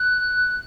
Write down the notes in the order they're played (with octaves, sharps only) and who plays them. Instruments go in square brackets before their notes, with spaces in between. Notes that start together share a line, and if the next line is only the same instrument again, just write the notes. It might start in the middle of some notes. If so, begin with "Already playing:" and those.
Already playing: [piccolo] F#6